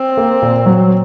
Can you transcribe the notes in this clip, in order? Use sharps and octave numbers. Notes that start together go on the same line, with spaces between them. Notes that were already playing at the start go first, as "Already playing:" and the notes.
Already playing: C4
A#3
A#2
F#3